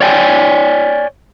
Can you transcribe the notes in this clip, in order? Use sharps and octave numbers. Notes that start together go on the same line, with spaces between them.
C#5 D5 G5 G#5